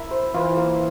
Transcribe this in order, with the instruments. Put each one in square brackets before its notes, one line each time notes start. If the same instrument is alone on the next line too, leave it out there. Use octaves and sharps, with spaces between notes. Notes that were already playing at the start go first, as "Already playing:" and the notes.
Already playing: [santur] E4 A#4 E5
C5
[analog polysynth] E3 [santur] F4
[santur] A#3